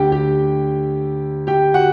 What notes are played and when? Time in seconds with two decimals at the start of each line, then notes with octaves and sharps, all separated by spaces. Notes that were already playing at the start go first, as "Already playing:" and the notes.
Already playing: D2 D3 G4 G5
0.12 G4 G5
1.47 G4 G5
1.74 F#4 F#5